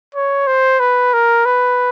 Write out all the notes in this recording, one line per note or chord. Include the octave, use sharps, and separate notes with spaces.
C#5
C5
B4
A#4
B4